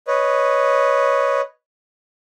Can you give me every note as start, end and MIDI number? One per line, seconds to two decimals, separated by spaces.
0.08 1.41 71
0.08 1.41 73
0.08 1.41 75